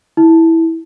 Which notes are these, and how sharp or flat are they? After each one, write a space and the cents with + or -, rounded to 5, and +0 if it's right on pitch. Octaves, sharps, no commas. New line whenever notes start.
E4 -10